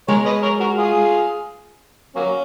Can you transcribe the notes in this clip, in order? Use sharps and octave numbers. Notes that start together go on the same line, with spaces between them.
G#3 A#4 C#5
B4 D#5
A#4 C#5
F#4 A#4
F4 G#4
F#3 A#3 C#4